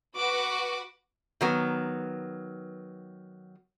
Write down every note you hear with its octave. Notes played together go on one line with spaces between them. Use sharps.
F#4 B4 D6
D#3 F#3 B3